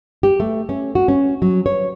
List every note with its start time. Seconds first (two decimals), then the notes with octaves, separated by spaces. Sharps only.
0.23 G4
0.40 A3
0.69 C#4
0.95 F#4
1.08 C#4
1.42 F#3
1.66 C#5